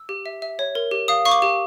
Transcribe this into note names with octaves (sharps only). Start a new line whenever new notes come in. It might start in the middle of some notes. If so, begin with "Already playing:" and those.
Already playing: E6
G4
E5
E5
C#5
A#4
G4
F5 D#6
F5 C#6
D6
G4